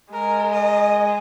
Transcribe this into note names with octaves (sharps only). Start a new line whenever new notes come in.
G#3 A#4
D#5